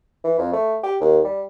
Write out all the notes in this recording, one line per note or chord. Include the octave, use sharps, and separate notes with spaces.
E3
F2
A3
G4
D#2
G3